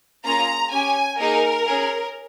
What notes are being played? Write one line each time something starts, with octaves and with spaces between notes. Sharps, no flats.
A#3 C#4 F4 G#4 A#5
C#4 G4 G#5
A#3 D#4 G#4 A#4
C#4 G#4